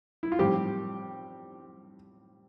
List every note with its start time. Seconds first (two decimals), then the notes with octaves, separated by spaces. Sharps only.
0.23 E4
0.32 F4
0.39 A2 F3 G3 C4 G4